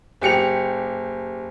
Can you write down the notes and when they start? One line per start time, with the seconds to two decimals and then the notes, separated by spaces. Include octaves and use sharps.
0.21 F#1 G4 C#7 F7